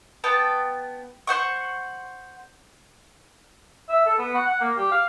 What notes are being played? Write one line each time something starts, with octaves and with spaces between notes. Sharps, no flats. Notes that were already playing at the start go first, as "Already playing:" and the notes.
B3 G5 A5
C5 F#5 C#6
E5
A4
B3
F#5
F#5
A#3
G4
F5